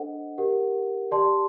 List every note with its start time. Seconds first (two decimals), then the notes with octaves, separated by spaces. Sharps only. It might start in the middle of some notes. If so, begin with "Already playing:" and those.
Already playing: D4 A4 C5 D#5 F#5
0.38 G4 A#4 F#5
1.12 G4 D5 A5 C6